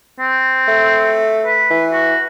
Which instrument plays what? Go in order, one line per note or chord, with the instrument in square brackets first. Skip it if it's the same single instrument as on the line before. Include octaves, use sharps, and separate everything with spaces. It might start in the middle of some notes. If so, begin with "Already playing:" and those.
[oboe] C4
[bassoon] A3
[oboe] B4
[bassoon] E3
[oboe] F#4